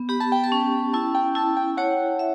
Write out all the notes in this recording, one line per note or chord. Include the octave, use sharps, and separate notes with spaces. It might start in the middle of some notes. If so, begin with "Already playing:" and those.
Already playing: B3
G4 B5
A5
G5
A5
C#4
E4 A5
G5
E4 A5
G5
C#5 F#5
E5